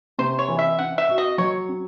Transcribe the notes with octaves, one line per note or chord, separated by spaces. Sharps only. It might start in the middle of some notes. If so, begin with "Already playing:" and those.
C3 C5
C#5
E3
E5
C4 F#5
E5
F#4
D#5
F#3 C#5
C4